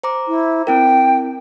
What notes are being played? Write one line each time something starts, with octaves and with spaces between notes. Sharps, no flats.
C5 A#5 D6
E4
C4 E4 A#4 G5